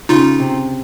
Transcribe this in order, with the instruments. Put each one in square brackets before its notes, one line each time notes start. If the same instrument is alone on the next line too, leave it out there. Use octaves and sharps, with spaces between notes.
[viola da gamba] C#3 [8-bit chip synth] D#4 F4
[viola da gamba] C3